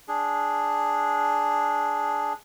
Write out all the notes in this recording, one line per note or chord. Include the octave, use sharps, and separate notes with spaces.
D4 G#4